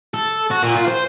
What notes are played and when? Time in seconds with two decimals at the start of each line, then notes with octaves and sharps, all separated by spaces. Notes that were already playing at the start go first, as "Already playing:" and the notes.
0.14 A4
0.51 F#4
0.63 A#2
0.75 F4
0.88 C5